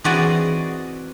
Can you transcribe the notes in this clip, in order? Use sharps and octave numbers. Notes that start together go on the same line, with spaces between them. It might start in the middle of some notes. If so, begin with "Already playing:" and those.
E3 C4 F#4 G#4 D5 D#5